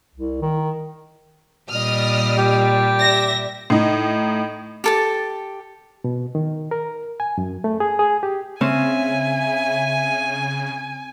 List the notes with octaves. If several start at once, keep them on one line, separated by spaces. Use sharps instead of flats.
C2
D#3
A#2 G3 D#5 D#6 F6
G4
D5 E5 A#6
A2 D#4
G4 A4 A5
B2
D#3
A#4
G#5
F#2
A3
G#4
G#4
G4
C#3 C4 C#4 E5 G#5